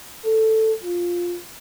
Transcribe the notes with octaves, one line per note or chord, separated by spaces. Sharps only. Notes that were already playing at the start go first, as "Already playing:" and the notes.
A4
F4